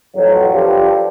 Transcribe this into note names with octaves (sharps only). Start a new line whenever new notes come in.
A1 F2 F#3
F3 D4 G4 A4 B4